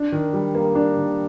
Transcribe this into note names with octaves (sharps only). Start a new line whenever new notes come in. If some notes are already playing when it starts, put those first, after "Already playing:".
Already playing: D4
D#3
G3
A#3
D4
D#3